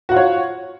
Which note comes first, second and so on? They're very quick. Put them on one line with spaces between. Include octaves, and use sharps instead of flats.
F#4 F#5 F4 C#5